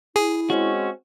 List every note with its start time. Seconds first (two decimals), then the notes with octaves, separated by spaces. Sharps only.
0.16 E4 G#4
0.50 G#3 C4 C#4 F#4